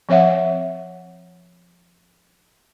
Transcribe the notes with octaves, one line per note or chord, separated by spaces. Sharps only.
F3 C4 C#5 E5 F#5